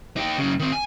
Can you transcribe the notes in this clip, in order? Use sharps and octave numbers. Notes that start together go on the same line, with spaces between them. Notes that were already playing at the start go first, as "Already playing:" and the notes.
D#4 G4
F#2 C#3
D#3 C4
G#5